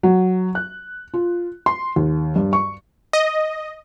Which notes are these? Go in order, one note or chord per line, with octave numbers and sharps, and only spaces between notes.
F#3
F#6
F4
C6
D#2
G2
C#6
D#5